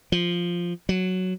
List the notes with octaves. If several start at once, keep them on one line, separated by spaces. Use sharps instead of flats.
F3
F#3